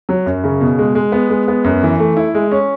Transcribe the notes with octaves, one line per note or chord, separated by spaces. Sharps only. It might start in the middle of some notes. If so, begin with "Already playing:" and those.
F#3
F#2
C#3
B2
G#3
G#3
B3
G#3
B3
F#2
E3
A3
E4
G#3
C#4